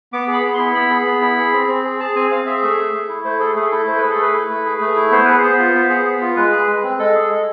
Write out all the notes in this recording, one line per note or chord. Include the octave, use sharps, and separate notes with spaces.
B3 D6
G#4
B5
B3
E4 C6
B3 B5
G#4
B3
E4
G#4
C4
C4
G#4
G#4 A5
C4 G#5
C4 F5
G#4 E5
A3 E5
G#4
A3
E4
A3 C5
G#4 A4
A3 G#4
E4 A4
A3 C5
G#4 B4
A4
A3 B4
E4
A3
G#4
A3
E4
B3 C5
G#4 B4
C5
B3
F4
B3
G#4
B3
F4
G#3 B4
G#4
G#3
C4
G#3 A4
G#4
G#3